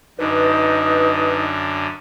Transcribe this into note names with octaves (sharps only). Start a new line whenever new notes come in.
F#2 D3 D#4 B4